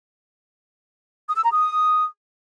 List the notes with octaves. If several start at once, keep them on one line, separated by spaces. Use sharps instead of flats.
D#6
E6
A#5
D#6